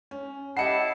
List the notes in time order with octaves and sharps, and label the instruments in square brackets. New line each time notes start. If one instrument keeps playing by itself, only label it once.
[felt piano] C#4
[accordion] E4 A5 [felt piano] G4 D#5 F#5 [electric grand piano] C7 C#7